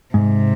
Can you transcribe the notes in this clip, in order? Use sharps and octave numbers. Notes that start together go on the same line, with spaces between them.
G#2 C3